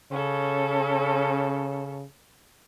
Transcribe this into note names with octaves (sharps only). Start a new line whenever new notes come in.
C#3 C#4 A4